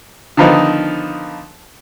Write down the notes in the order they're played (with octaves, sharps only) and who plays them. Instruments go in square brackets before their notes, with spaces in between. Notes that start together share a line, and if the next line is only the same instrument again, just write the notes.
[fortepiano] D3 D#3 F3 B3 D#4